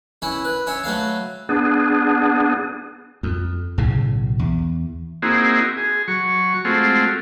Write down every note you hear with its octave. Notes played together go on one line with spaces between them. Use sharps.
C#4 E4 B4
B4
C#4 C#5 E5
F#3 A3 B4 F5
B3 D4 G#4
F2
B1 A2 C#3
E2
A#3 C4 D#4 E4 F#4 G#4
G#4
F#3 C#6
G#3 A3 C4 F4 F#4